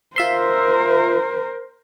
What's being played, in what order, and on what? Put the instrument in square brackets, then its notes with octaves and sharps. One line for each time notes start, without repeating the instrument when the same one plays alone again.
[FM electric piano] F4 E5 C6 [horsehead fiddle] A#4 C5